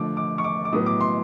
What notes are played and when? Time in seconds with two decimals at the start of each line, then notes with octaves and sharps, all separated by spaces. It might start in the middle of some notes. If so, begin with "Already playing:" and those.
Already playing: D3 F3 A3 D6
0.17 D6
0.38 C#6
0.44 D6
0.65 D6
0.73 A2 F#3 B3 D#6
0.86 D6
1.01 C6